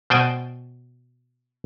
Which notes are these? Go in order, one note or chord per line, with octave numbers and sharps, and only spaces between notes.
B2 C5 D5 G5 G#5